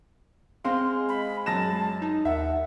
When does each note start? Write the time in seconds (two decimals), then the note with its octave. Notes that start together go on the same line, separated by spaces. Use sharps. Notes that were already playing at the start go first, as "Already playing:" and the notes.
0.65 G#3 C4 F5 C6
1.09 B5
1.46 F#2 A5 A#6 E7
2.02 D#4
2.25 D#2 E5 F#5